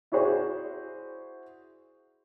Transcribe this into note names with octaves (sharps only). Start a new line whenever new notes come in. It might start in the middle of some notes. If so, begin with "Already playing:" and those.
E4 F#4 G#4 C5 D5